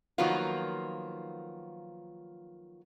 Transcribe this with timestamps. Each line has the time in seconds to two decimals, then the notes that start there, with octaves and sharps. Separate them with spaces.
0.18 D#3 F3 F#3 A#3 B3 F4